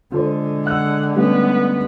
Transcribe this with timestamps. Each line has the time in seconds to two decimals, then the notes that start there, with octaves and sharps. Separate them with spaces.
0.12 D3 G#3 F4 A4 C5
0.67 F#5 E6 F#6
1.16 G3 A3 B3 C#4